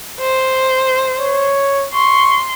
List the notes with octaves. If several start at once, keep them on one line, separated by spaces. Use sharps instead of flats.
C5
C#5
C6 C#6